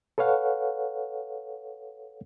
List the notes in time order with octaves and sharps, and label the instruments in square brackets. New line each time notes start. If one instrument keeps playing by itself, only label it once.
[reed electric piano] A4 B4 C#5 F5 F#5